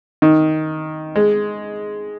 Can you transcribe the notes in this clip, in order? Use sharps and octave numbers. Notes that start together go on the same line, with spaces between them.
D#3
G#3